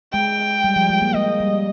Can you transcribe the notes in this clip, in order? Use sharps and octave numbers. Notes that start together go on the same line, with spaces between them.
G#3 G5
G3
F3
G#3
A#3
G#3 D#5
G3